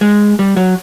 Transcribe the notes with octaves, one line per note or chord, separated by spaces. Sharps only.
G#3
G3
F#3